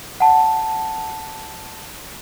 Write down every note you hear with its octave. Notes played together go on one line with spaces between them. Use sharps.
F#5 A5